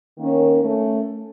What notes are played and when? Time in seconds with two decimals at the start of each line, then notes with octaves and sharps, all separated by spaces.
0.18 D#3 A#3 C#4
0.61 A3 C#4